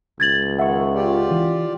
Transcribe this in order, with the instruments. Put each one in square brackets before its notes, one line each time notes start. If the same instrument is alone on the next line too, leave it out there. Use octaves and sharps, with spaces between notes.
[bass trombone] C#2 [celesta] G#6 A6 F#7
[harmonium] D#3 [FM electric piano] E5 C#6 [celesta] F#5
[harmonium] F4 G4 D5
[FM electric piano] E3